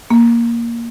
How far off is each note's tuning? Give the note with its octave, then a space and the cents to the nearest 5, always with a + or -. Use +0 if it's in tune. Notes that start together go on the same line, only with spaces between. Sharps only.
A#3 +5